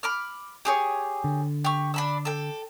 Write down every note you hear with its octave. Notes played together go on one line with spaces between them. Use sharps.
B5 D6 F6
G4 G#4 C#5
D3
G4 C#6
D4 B5 E6
A4 G5